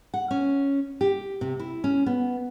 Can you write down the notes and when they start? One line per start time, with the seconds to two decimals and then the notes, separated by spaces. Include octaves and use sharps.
0.14 F#5
0.31 C#4
1.01 G4
1.41 C3
1.59 E4
1.84 C#4
2.06 B3